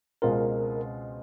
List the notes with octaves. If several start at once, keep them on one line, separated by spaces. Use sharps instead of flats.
C#2 B2 G#3 C4 F4 A#4